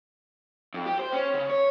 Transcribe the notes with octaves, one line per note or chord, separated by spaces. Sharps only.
F2
G4
C5
C#4
C#3
C#5